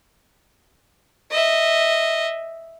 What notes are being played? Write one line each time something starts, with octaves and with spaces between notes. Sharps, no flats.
D#5 E5